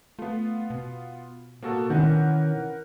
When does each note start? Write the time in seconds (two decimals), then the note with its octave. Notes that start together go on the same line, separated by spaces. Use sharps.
0.19 A3 B3 F4
0.70 B2
1.62 B2 A#3 F#4 A4
1.90 B2 D#3 E3 C#4 A#4 B4 F#5 G6